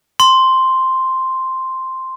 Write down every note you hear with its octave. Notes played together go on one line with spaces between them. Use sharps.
C6